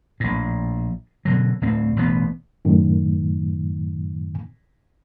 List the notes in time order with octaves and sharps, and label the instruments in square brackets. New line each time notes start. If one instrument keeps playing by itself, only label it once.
[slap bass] A#1 A2
B2 D3 F#3
D1 A2 C4
A1 B2 D3 B3
[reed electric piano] F#2 A2 D#3